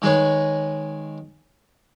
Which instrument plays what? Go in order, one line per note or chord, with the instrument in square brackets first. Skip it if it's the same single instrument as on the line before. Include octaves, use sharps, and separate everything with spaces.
[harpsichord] D#3 G#3 G#4 B4 C#5